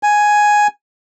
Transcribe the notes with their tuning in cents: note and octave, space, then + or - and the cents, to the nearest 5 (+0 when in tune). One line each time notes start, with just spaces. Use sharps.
G#5 +5